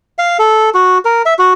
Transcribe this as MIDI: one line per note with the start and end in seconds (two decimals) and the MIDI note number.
0.19 0.37 77
0.39 0.70 69
0.74 0.98 66
1.05 1.22 70
1.26 1.34 76
1.39 1.53 66